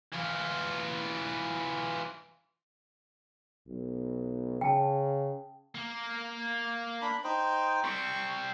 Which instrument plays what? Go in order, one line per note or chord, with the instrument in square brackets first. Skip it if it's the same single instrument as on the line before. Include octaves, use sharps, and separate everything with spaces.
[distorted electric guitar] E3 F4
[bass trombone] B1
[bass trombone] C#3 [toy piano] G5 A5
[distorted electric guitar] A#3
[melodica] D4 B5
D#4 C5 G5
[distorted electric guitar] G3 C4 [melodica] C#6